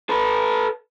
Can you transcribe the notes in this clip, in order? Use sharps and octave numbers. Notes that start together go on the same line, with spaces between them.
A4 B4